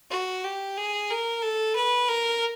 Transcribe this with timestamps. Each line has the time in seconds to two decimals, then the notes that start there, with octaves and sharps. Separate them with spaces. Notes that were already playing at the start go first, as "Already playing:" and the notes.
0.10 F#4
0.44 G4
0.77 G#4
1.10 A#4
1.42 A4
1.75 B4
2.08 A#4